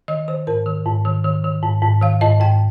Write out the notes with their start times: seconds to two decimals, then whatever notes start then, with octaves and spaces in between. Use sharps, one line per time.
0.08 D#3 D#5
0.28 D#3 C5
0.47 G#2 A#4
0.66 D#3
0.85 G#2
1.05 D#3
1.25 D#3
1.44 D#3
1.63 G#2
1.82 G#2
2.01 D#3 F5
2.21 G#2 D#5
2.40 G#2 G5